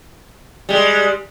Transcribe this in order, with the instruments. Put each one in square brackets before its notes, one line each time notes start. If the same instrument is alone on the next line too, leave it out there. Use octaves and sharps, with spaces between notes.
[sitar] G3 G#3